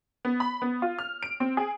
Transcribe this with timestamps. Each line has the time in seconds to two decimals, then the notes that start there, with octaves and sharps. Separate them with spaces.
0.25 B3
0.40 B5
0.62 B3
0.82 F4
0.99 F6
1.23 D7
1.40 C4
1.57 G#4